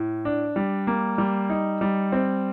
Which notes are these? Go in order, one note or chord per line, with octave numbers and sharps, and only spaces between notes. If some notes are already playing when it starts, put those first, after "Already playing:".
Already playing: A2
D4
G3
A#3
G3
D#4
G3
C4